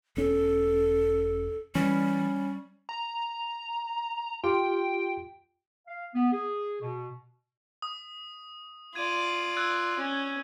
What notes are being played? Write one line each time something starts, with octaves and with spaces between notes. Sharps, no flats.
E1 C#4 A4
E3 G3 C#4
A#5
F4 G4 G5
F5
B3
G#4
B2
D#6
F4 D5 G#6 D#7
E6 F#6 G#6
C#4